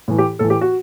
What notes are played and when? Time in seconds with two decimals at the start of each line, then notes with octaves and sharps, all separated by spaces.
0.08 A2 E3
0.18 G4
0.39 A2 E3 A4
0.50 G4
0.61 F#4